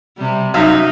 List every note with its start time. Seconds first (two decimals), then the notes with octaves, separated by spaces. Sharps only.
0.17 C3 G3
0.54 F#2 D#4 E5 F5